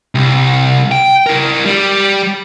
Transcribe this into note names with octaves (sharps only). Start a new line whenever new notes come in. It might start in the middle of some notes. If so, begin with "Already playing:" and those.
C2
G5
E4 A#4
G3